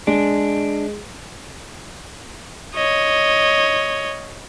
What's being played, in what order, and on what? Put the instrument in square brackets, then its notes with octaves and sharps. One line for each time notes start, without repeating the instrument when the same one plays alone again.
[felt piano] G#3 [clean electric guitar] D4
[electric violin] C#5 D#5